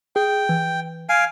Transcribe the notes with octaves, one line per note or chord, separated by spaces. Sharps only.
G#4 G5
E3
F5 G#5 D7